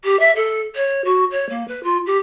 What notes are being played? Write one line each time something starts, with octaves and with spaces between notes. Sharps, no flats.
G4
E5
A4
C#5
F#4
C#5
A#3
B4
F4
G4